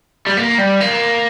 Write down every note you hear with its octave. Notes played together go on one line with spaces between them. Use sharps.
G3
A#3
G3
A#3